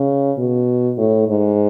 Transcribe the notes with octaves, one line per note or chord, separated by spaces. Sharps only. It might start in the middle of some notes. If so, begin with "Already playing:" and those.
Already playing: C#3
B2
A2
G#2